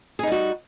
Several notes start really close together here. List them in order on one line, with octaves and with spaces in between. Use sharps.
G#4 D#4 G3 F#4